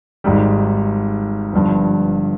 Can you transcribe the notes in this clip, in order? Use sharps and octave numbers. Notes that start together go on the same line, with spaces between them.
G#1 G#2 G3
G1 G2 F3